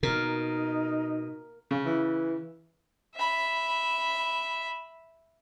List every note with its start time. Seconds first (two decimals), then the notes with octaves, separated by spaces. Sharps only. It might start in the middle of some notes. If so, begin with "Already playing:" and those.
0.03 B2 D#4 A#4
1.71 C#3
1.86 E3
3.16 E5 B5